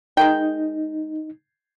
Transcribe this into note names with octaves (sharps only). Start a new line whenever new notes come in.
G#3 D#4 A#4 G5